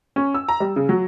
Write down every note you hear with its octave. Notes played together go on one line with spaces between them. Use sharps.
C#4
E6
A#5
G3
C#3
F#3